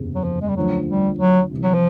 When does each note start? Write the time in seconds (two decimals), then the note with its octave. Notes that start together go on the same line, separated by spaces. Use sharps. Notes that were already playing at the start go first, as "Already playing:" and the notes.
Already playing: F#1 E2 C3
0.15 F#3
0.24 F3
0.42 G#3
0.49 G3
0.56 D2 D3 F3 F#3
0.87 G3
1.19 F#3
1.51 C2 C3 E3
1.64 F#3
1.74 F3